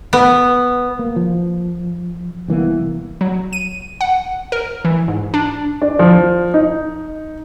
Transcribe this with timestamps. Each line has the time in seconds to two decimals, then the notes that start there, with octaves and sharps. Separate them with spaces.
0.13 B3
0.99 A#3
1.16 F3
2.48 C2 E3 A#3 B3
3.21 F#3
3.53 D#7
4.01 F#5
4.52 A#4
4.85 E3
5.08 G#2
5.34 D4
5.82 D4
5.99 F3
6.54 D#4